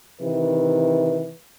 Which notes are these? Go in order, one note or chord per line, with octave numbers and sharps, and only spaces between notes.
C3 D#3 E3 B4